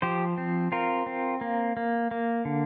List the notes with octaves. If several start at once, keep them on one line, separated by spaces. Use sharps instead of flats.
F3 G4 C5
C4
C4 F4 A#4
C4
A#3
A#3
A#3
D3